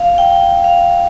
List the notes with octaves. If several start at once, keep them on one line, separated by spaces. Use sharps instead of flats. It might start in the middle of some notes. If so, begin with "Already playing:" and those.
Already playing: F5
G5
F5